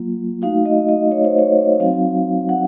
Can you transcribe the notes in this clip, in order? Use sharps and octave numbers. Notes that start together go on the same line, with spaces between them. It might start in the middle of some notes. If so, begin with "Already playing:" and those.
Already playing: F#3 A#3 F4
A3 D#4 F#4 F5
D#5
D#5
C#5
C5
C#5
F#3 C4 D#4 F#4 F5
F#5